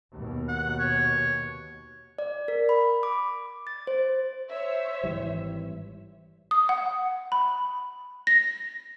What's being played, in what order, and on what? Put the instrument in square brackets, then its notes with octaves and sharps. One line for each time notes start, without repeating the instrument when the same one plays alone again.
[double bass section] D#2 B2
[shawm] F#5
C#5
[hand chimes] D5
A#4
B5
D6
A6
C5
[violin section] C5 C#5 E5
[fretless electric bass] G#1 E3 G3
[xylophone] D#6
F#5
B5
A#6